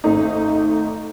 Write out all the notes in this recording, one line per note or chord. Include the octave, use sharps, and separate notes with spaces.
G#1 A3 D#4